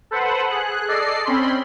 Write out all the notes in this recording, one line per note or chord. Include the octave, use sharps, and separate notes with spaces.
A4 B4 C5 F#5
G#4 F#6
A4 D5 D#5 C7
C4 C#4 B5 C6